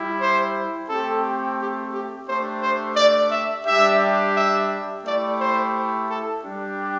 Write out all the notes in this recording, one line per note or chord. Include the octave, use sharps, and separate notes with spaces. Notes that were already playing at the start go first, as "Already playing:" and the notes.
Already playing: G3 E4 G4
C5
A3 C4 G4 A4
G4
G4
A3 D4 G4 C5
C5
D5
E5
G3 D4 G4 E5
E5
A3 E4 G4 D5
C5
A4
G3 D4 G4